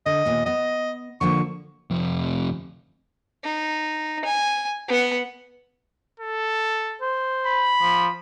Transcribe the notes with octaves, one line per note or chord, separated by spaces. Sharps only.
D3 D#5
D#2 A#2 B3
B3 D#5
D3 F3 A#3 C#6
F2 C3
D#4
G#5
B3 F#5
A4
C5
B5
F3